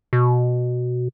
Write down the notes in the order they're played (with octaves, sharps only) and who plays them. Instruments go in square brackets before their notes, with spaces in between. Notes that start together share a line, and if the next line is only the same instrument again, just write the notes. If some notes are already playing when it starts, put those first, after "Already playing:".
[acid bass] B2